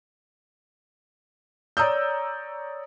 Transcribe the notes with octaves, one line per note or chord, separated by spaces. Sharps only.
C#5 D5 A#5 D#6 E6 G6